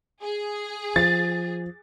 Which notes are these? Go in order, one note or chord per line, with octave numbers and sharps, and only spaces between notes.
G#4
F3 A6